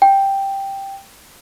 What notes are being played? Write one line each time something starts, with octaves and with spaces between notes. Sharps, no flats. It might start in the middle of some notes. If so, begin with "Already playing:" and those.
G5